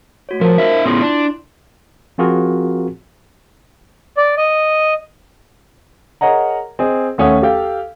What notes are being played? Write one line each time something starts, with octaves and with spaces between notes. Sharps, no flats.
A3 F#4 C#5
F3 A#4 C5 A5
D#4 F4 E5
B3 C#4 E4 F4 G#4 C6
D4
F3 C4 F4 F#4 G#4 A#4
D5
D#5
G#4 A#4 C#5 D#5 F#5 A#5
C4 G#4 D#5
D#2 A3 C#4 F#5 D#6
G4 A4 F5 G5